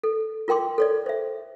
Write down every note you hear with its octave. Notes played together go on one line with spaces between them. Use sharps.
A4
F4 A#4 G5 C6 D6
A4 C#5 D5
C5 E5